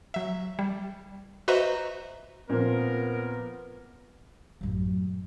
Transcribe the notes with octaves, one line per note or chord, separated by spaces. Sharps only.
F#3 E5
G3
F#4 B4 C5 D#5 E5 A#5
A#2 F3 B3 C4 A#4 C5
A1 F#2